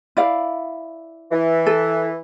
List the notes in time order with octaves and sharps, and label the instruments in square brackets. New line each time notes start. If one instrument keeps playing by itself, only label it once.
[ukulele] E4 D5 F5
[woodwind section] E3
[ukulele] A4